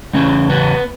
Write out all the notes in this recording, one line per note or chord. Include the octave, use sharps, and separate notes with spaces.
E2 C#3 C#4
B3